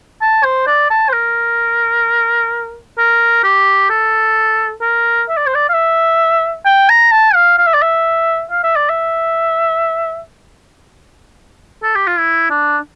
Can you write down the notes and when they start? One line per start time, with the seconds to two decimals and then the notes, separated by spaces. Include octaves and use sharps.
0.22 A5
0.44 C5
0.67 D5
0.90 A5
1.09 C5
1.13 A#4
2.98 A#4
3.44 G4
3.90 A4
4.82 A#4
5.29 E5
5.37 D5
5.46 C5
5.55 D5
5.69 F5
5.74 E5
6.66 G5
6.90 A#5
7.12 A5
7.35 F5
7.58 F5
7.67 E5
7.74 D5
7.82 E5
8.51 F5
8.64 E5
8.76 D5
8.90 E5
11.83 A4
11.95 G4
12.07 F4
12.19 E4
12.50 D4